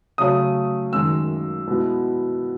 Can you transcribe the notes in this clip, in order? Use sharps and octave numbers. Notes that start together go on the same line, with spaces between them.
C#3 F#3 A3 C#4 D#6
F#2 D#3 G#3 E6
B2 G#3 B3 E4